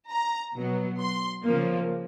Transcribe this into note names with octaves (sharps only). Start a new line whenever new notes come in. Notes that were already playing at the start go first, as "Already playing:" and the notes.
A#5
B2 F#3 B3
C6
C#3 F3 A#3